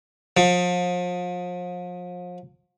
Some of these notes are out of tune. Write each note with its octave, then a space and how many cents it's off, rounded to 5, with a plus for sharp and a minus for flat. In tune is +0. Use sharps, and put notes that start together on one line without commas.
F3 +35